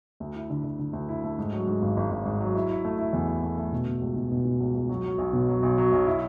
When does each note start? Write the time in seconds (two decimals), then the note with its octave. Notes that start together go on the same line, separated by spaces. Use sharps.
0.20 D2
0.35 E4
0.50 D3
0.64 D3
0.79 D3
0.93 D2
1.09 E4
1.23 A3
1.38 G#2
1.52 F#3
1.67 G#2
1.82 G#1
1.97 G#1
2.11 G#1
2.26 G#2
2.41 F#3
2.55 E4
2.69 E4
2.85 A3
2.98 E4
3.13 E2
3.28 E4
3.42 A3
3.57 A3
3.72 B2
3.87 B2
4.02 C#2
4.16 B2
4.31 B2
4.45 B2
4.61 C#2
4.75 C#2
4.89 F#3
5.04 F#3
5.18 B1
5.33 B2
5.49 F#3
5.63 B1
5.78 F#3
5.92 B1
6.07 E4